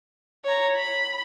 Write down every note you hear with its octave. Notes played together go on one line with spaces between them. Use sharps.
C#5 A#5
B5